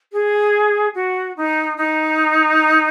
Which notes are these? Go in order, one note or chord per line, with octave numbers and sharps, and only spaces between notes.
G#4
F#4
D#4
D#4